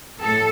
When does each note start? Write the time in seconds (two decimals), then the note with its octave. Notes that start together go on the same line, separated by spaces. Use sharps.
0.21 A2 A4